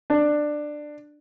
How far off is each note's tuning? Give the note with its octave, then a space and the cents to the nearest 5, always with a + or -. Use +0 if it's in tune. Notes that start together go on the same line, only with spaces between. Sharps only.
D4 +15